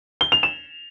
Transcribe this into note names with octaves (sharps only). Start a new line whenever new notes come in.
G7
F7
E7